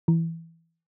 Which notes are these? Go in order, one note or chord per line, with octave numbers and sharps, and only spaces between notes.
E3